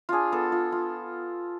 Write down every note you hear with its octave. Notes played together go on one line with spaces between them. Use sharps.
D4 F4 G#4
B3 A4
F4
F4